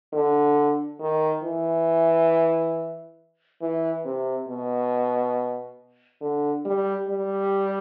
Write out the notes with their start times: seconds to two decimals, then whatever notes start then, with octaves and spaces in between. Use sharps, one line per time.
0.13 D3
1.00 D#3
1.44 E3
3.61 E3
4.05 C3
4.48 B2
6.21 D3
6.65 G3
7.08 G3